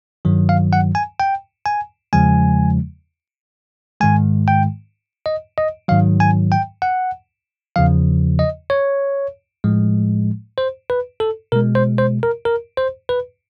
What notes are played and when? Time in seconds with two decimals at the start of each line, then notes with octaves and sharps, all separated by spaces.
0.25 G2 D#3 F#3
0.49 F5
0.73 F#5
0.95 G#5
1.20 G5
1.66 G#5
2.13 E2 C#3 F3 G#3 G#5
4.01 G#2 D#3 G#3 G#5
4.48 G5
5.26 D#5
5.58 D#5
5.88 G#2 D#3 F#3 F5
6.20 G#5
6.52 G5
6.82 F#5
7.76 E2 C#3 F3 F5
8.39 D#5
8.70 C#5
9.64 A2 F3 G#3
10.58 C5
10.90 B4
11.20 A4
11.52 B2 G#3 A#4
11.75 C5
11.98 C5
12.23 A#4
12.45 A#4
12.77 C5
13.09 B4